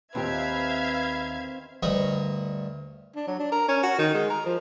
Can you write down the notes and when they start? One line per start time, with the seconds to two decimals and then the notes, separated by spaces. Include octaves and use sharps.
0.15 D#2 C4 G4 B4 E5 F5 G#6
1.83 D2 G2 A#4 D#5 B5 C#6
3.16 D4
3.27 F#3
3.39 D4
3.52 A#4
3.68 C#4
3.83 F#4
3.99 D#3
4.14 G#3
4.30 A#4
4.46 F3